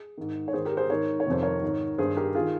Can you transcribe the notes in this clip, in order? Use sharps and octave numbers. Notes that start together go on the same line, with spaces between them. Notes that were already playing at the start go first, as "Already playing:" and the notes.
Already playing: G#4
G#2 D#3
C#5
G#2 D#3 G#4 C5
G4 A#4
G#4 C5
G#2 D#3 A#4 C#5
C#5
F2 C3 D#3 C5
A#4 C#5
G#2 D#3
G2 D#3 G#4 C5
G4 A#4
D#3 F4 G#4